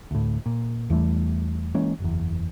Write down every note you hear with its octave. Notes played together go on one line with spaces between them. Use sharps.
D2 A2
A#2
E2 E3 G3 A3
E3 G#3 A#3 C#4
F#1 E2